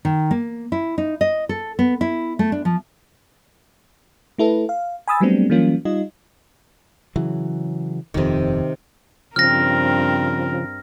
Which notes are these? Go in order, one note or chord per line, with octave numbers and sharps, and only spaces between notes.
D#3
A#3
E4
D#4
D#5
A4
B3
E4
A3
D4
F3
A3 E4 A4 B4
F5
G#5 B5 D#6 E6 A6
F#3 G3 A3 B3 C4 D4
E3 F#3 G3 A#3 C#4 F4
G3 D#4 F4 D#5
C#3 E3 F#3
D#1 F2 C3 D#3
G2 C#3 F3 C4 A#4 F6 A#6